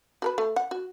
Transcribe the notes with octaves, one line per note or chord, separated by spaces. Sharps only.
F#4 A#4 B4
A3
F#5
F#4